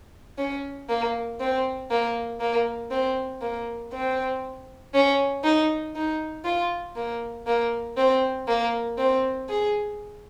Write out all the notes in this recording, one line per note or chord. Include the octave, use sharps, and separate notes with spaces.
C#4
A#3
C4
A#3
A#3
C4
A#3
C4
C#4
D#4
D#4
F4
A#3
A#3
C4
A#3
C4
G#4